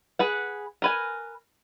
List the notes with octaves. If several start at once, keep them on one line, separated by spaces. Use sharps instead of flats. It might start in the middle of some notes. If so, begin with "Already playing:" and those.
G#4 B4 F#5
A#4 B4 G#5